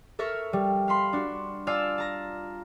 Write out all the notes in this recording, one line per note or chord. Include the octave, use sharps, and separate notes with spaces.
A4 A#4 E5 C#6 F6
G3
F5 B5 C6
D4 F#4
F4 D5 F5 G#5 A5 E6
A5 A#5 A#6